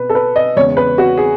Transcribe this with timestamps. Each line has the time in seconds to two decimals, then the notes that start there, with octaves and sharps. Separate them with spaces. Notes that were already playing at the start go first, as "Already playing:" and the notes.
Already playing: B2 B4
0.10 A4
0.15 B4
0.36 D#5
0.57 E2 C#3 G#3 C#5
0.77 B4
0.98 F#4
1.18 G#4